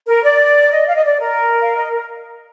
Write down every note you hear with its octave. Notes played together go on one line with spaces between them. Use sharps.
A#4
D5
D#5
F5
D#5
D5
A#4
F5
D#5